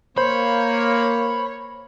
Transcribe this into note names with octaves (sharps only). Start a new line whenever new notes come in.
A#3 C5 C#5 B5